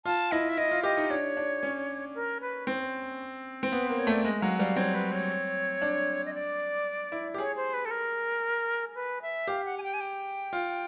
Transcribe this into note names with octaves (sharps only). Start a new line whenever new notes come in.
F4 A5
E4 D#5
E5
E4 D#5
F4
G4 D#5
D#4
D4 C#5
D4
C#4
A#4
B4
C4
C4
B3 B4
A#3 C5
C#5
A3 D5
G#3 D#5
F#3 F5
G3 F5
C4 C#5
B4
C#5
D4
D#5
D5
E4
G4
G#4 C#5
C5
B4
A4
A#4
B4
E5
G4 F5
F#5
G#5
G5
G#5
G5
F4